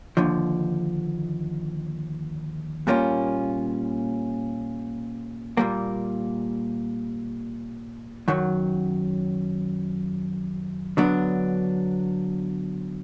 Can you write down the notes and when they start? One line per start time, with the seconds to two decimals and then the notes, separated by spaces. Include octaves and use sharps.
0.17 D#2 D3 F3
2.87 A#2 G3 A#3 C#4 F4
5.57 A#2 G3 A#3
8.28 F#2 D#3 F#3
10.97 D3 F#3 B3 D4